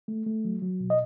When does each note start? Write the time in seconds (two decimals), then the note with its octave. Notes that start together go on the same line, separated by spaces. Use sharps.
0.08 A3
0.26 A3
0.45 F#3
0.62 F#3
0.80 B2
0.90 D#5